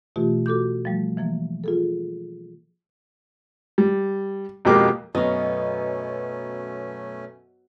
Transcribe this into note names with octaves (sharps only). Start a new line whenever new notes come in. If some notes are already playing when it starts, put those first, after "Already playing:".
B2 E3 A3 F4 G4
F#4 A4 D6 G6
F3 G3 A3
E3 F3 A#3
F4 G#4 A4
G3
F2 B2 G#3 A#3 G4 D6
F#2 B2 A3 B3 C#4 D#5 F5 C#6